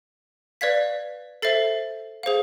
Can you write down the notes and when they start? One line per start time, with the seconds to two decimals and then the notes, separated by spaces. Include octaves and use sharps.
0.61 B4 D5 F5 G#6 B6
1.42 A4 C5 E5 A6 C7
2.23 G#4 C5 F5